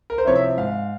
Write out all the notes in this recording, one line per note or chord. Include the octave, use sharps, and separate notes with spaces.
A#4
C5
C3 F3 C4 E4 C#5
E5
G#2 F5